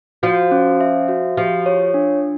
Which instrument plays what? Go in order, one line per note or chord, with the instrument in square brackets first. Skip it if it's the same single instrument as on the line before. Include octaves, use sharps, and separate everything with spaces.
[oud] F3 [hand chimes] F#4
[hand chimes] C#4
E5
F#4
[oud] F3 [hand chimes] G4
[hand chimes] C#5
D4